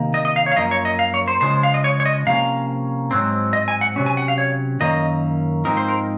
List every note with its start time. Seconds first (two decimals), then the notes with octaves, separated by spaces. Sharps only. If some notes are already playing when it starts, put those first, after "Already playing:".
Already playing: C3 D#3 A#3
0.14 D#5
0.25 D#5
0.36 F5
0.46 C#5
0.52 F5
0.56 F#2 F3 A#3 D#5
0.71 C#5
0.85 D#5
0.99 F5
1.14 C#5
1.28 C5
1.41 C#3 F3 G#3 C5
1.63 F5
1.74 D#5
1.84 C#5
2.00 C#5
2.06 D#5
2.26 C3 F3 A#3 C#4 F5
3.11 G#2 F#3 C4
3.53 D#5
3.68 G#5
3.81 F#5
3.96 C3 F#3 C#4
4.06 G#5
4.17 F#5
4.28 F5
4.38 C#5
4.80 F#2 D#3 A#3 C#4 D#5
5.65 G#2 F3 C4 D#4 A#4
5.77 C5
5.88 A#4